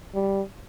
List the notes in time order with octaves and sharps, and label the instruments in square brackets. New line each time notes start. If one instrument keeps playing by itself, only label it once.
[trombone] G3